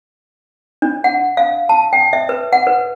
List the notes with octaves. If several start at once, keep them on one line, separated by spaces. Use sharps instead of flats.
D4
F#5
F5
A5
G5
E5
B4
F#5
B4